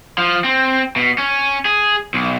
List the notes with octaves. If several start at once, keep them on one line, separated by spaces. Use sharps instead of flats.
F3
C4
B2
C#4
G#4
B1